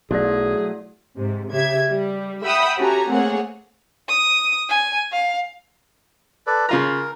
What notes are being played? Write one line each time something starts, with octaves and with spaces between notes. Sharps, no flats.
B1 F#3 A3 E4 G#4 D5
G#2 C3
C#3 G4 E5 G#6
G3
E5 F#5 G5 B5 D#6 E6
C#4 F#4 G4 A4 G#5 A#5
A3 A#3 C4 G#4 C#5 F#5
D#6
G#5
F5
A4 B4 D5
C#3 F4 A#4 A#5